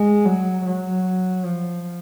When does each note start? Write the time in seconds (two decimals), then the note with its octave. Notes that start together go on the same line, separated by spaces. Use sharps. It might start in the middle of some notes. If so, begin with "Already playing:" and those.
Already playing: G#3
0.25 F#3
0.66 F#3
1.45 F3